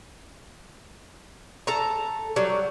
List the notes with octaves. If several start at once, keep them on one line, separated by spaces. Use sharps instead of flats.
A4 A5 A#5
F#3 G3